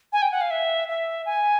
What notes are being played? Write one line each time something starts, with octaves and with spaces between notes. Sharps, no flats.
G#5
G5
F#5
F5
E5
E5
G#5